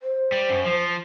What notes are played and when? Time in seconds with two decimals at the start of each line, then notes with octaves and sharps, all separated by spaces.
0.01 C5
0.32 G3
0.50 F#2
0.66 F3